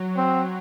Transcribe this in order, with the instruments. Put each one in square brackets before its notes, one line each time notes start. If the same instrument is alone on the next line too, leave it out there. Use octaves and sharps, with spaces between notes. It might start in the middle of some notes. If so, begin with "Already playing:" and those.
Already playing: [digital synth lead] F#3
[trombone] C4